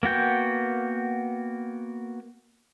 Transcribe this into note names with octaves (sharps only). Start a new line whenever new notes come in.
A#3 B3 F#4 G5